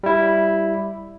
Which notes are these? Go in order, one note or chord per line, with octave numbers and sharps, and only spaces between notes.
G3 E4